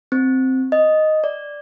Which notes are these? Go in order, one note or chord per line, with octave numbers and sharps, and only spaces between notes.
C4
D#5
D5